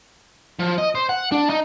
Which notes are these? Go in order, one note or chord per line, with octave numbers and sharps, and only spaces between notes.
F3
D#5
C5
F#5
D4
D#4